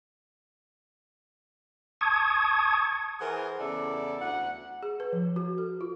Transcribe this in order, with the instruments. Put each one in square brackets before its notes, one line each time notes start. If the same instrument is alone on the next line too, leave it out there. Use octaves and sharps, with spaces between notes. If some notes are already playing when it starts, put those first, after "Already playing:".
[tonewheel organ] A5 C#6 D#6 G#6
[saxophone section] E3 G#4 A#4 C5 F#5
E2 C#3 E4 A4 D5
D2 F#5
[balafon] G#4
B4
F3
F#4
A4
F4